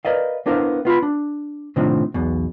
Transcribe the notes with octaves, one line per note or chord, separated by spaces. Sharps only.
A#4 B4 D5 D#5 F5
B3 D4 E4 A#4 C5 F5
B3 F4 A#5 B5
D4
A2 C3 D#3 F3 C4 D4
B1 E2 B2